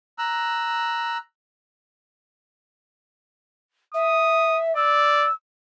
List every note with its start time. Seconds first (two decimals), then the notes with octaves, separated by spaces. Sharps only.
0.18 A#5 E6 F#6
3.94 E5 D#6
4.76 D5 E6